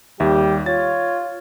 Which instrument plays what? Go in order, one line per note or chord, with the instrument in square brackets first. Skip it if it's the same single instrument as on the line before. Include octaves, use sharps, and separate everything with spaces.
[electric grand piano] D#2 E5 [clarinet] G3 [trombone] G4
[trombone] F4 [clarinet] C#5 [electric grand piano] A6